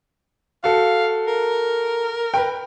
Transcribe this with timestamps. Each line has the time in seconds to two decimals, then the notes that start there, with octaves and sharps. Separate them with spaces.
0.64 F#4 A4 F5
1.27 A#4
2.34 B4 G5